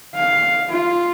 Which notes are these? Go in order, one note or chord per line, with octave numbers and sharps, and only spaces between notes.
F5
F4